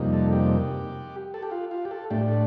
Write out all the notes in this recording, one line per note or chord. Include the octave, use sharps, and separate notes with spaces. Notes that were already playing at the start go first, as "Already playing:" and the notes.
Already playing: F2 C3 G3 A#3 D#4
A4
G4
A4
G4
F4
F4
G4
A4
A2 A3 D4 G4